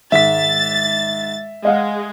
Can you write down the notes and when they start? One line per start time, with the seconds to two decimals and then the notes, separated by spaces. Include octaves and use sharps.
0.12 G#2 D#3 E5 A6 B6
1.65 G#3 D#5 F5 F#5